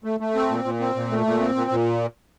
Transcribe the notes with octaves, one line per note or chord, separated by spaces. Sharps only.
A3
A3
C4
A#2
A#2
C4
A#2
A3
A#2
C4
A#2
A#2